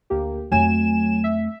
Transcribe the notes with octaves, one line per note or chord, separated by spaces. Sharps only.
D2 A#3 G4
F2 F#3 A3 G#5 E7
E5